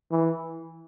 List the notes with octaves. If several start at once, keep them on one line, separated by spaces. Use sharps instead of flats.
E3